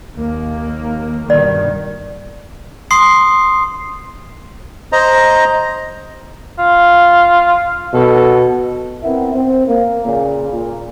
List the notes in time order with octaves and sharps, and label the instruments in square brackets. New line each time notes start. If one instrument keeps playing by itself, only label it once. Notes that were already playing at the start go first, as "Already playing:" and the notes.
[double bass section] D#2 A#3
[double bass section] G2 B2 D#3 [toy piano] D5
[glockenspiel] C6 D#6 C7
[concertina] C5 D#5 A#5
[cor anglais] F4
[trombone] B2 [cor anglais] A4
[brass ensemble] B3 C4 E4 A#4 B4 E5
C4
A#3
A#2 C#3
A#2